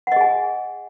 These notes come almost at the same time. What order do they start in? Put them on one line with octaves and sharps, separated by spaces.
F#5 D#5 G#4 G#5